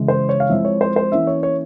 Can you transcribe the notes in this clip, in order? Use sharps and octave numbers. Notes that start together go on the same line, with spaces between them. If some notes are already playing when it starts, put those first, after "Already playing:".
Already playing: C#3 E3 G#3
C5
C#5
F5
F3 G#3 C4 E4 E5
C#5
C5
C5
E3 A#3 C#4 E4 E5
C#5
C#5